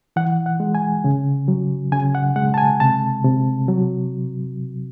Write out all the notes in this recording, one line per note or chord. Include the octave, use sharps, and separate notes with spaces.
E3 F#5
F#5
G#3
G#5
C#3
F#3
C#3 G#5
F#5
G#3 F#5
A5
G#5
C3 A5
C3
F#3